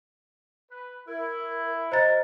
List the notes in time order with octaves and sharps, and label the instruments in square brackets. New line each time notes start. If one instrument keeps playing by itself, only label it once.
[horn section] B4
[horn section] E4 [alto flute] A#4
[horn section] A#3 F#4 A#4 [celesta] C5 A#5 A6 [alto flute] D#5